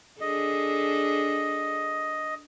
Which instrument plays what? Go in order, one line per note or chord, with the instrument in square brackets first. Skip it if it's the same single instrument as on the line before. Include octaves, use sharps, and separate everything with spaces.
[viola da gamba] D4 G#4 A4 [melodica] D#5